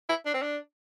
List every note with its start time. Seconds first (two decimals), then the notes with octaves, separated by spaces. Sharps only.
0.09 E4
0.26 D4
0.34 C4
0.42 D4